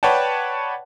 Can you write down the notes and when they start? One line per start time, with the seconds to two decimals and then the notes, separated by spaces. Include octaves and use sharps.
0.03 B4 C#5 D5 F#5 G5 A5